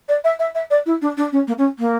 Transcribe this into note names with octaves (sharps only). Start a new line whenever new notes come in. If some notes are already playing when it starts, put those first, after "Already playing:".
D5
E5
E5
E5
D5
E4
D4
D4
C#4
A#3
C#4
A#3